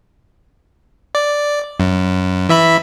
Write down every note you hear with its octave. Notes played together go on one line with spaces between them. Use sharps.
D5
F#2
E3 E5 B5